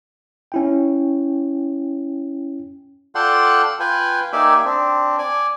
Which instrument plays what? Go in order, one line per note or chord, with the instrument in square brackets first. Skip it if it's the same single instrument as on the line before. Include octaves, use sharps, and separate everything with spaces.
[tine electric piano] C#4 E4 G5
[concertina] F4 A4 D5 F#5 G5 C6
F4 B4 G5 G#5
A#3 D#4 G4 D5 E5 G#5
C4 D4
D5 G#5